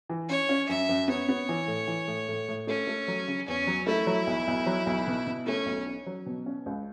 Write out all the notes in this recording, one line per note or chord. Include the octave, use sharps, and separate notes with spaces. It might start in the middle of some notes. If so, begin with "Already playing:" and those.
E3
C#4 C#5
C#4
F#2 E5
F#2
B3 C#5
B3
E3
A2
E3
A2
A2
A2
A3 C#4
A3
F#3
C#3
E2 C#4
F#3
A3 E4
F#3
B1
B1
F#3
B1
B2
B2
A3 C#4
B1
C#4
F#3
B2
C#4
C#2